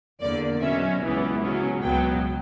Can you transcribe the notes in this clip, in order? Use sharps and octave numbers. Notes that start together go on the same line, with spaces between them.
E2 D3 A#3 D5
B2 F#3 C#4 E5
C#2 C#3 E3 B3
C#3 F#3 C#4
C#2 B2 F#3 B3 G5